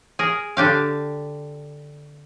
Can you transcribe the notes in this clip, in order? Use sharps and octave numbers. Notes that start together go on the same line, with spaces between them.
G#4 A#4
D3 D4 G4 F5